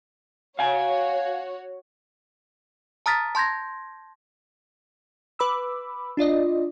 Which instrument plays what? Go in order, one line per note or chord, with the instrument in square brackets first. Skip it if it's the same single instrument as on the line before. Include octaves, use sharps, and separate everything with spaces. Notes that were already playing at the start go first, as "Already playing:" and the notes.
[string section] F#4 C#5 [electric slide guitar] F5 G#5
[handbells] A5 A#5 D#6 F6 A6 B6
A5 C6 G6 G#6 A#6
[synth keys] B4 B5 D6 E6
D4 F4 D5 D#5